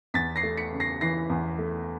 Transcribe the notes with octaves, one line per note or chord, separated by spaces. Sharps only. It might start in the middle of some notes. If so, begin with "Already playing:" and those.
E2 A6 B6
A#6 C7
A3
B6 C#7
C#3
A#6 C7
E3 A#6 C7
E2
A3